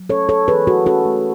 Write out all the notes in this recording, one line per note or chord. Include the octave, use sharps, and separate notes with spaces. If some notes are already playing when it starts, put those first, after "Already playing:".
Already playing: F#3
C#4 A4 C#5
A3 A4 C#5
E3 G#4 B4
E4 F#4 A4
C#4 F#4 A4
A3